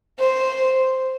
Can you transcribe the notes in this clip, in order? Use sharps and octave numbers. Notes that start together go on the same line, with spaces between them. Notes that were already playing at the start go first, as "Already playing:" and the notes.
C5